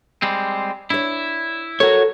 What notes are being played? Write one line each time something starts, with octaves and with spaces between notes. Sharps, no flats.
G3 G#3 C4
D4 E4 C#5
F#4 A4 A#4 C#5